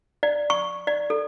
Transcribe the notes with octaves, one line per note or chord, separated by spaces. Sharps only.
D5
C#6
D5
A4